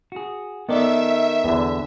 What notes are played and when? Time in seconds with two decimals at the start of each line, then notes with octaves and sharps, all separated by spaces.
0.12 F#4 G#4
0.69 D#3 B3 A4 D5 E5
1.44 E2 D3